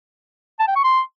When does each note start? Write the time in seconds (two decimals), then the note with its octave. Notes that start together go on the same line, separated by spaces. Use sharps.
0.59 A5
0.68 G5
0.76 C#6
0.84 C6